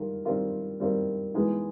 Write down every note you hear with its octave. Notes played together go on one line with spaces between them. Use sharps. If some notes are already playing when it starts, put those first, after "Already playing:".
Already playing: D#3 G3 F4 A#4
D#3 G3 C4 F4 A#4
D#3 G3 C4 F4 A#4
E3 G#3 B3 D#4 G#4